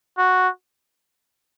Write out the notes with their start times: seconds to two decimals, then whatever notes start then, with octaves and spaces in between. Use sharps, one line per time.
0.18 F#4